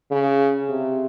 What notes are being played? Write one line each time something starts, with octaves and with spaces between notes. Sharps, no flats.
C#3
C3